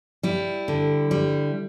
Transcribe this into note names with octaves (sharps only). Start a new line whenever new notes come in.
G3 E4
D3
G3